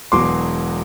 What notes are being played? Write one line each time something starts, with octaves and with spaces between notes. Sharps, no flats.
E1 E2 B2 F#3 C6 D6